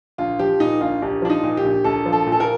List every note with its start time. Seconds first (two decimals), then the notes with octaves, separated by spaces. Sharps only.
0.18 A#1 F4
0.39 F3 G4
0.60 A#2 D#4
0.81 A#1 F4
1.02 A#1 G4
1.22 F3 D4
1.30 D#4
1.43 A#2
1.57 G4
1.65 A#1
1.84 A#1 A4
2.06 F3
2.12 A4
2.26 A#2
2.32 A4
2.40 A#4